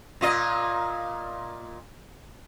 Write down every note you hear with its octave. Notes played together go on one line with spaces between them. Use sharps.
A#2 F4 D#5